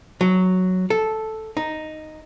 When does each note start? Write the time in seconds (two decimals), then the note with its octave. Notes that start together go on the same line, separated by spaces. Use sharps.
0.21 F#3
0.90 A4
1.57 D#4